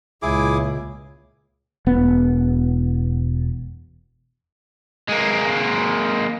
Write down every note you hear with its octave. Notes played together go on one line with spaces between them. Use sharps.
C#2 A#2 E4 G#4 D6
E1 B3
G#3 A#3